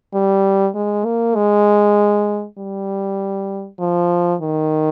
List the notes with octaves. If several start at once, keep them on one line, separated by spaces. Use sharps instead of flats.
G3
G#3
A#3
G#3
G3
F3
D#3